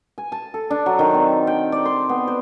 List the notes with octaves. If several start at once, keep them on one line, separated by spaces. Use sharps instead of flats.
G#5
A5
A4
D4
F#3
D#3
C4
G5
D5
C6
B3
C5